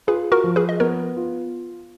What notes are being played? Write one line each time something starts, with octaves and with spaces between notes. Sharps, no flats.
F4 G#4 B4
F#4 A#4
F3
G#4 B4
D#5
B3 A#4 C#5
F4